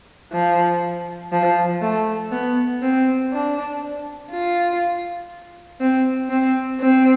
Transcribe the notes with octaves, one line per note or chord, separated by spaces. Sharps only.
F3
F3
A3
B3
C4
D4
F4
C4
C4
C4